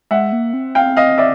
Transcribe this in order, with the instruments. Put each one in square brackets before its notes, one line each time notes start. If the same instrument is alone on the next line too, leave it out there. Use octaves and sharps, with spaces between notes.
[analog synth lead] G#3 [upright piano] E5 F#5
[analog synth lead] A#3
C4
[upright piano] F5 G5
D#5 F5
D5 E5